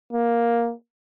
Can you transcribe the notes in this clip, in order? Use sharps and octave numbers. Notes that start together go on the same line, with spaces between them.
A#3